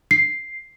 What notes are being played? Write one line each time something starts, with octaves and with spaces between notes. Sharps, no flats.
C7